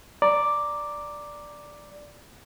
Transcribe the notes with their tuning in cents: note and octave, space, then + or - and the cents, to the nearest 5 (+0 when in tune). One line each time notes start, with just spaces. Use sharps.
D5 +0 A#5 +0